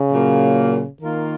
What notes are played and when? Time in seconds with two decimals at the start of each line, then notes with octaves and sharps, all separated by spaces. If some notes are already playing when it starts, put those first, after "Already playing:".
Already playing: C#3
0.11 A#2 F#3 A#3
1.02 D#3 A#3 F4 A#4